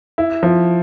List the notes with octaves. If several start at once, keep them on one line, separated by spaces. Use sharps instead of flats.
E4
F3